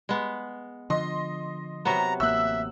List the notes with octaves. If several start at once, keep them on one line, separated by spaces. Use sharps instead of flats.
G#3 B3
D3 F3 D#5 C6
C3 F#3 B3 A#5
A1 A#3 E5 E6 F#6